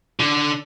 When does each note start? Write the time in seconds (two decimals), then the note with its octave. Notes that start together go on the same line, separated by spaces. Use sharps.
0.19 D3